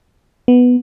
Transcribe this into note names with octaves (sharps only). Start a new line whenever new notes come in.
B3